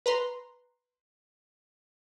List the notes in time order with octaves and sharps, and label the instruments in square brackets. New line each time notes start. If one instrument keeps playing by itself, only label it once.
[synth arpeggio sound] B4 A#5 C6